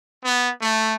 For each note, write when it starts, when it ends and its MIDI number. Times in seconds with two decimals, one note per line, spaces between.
0.24 0.50 59
0.61 0.95 57